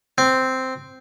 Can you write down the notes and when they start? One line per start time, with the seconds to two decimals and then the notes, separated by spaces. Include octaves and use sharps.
0.18 C4